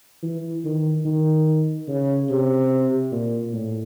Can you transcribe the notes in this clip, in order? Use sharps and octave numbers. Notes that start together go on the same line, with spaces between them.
E3
D#3
D#3
C#3
C3
A#2
A2